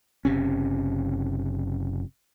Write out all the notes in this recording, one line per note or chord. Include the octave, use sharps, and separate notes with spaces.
F#1 C3 C#4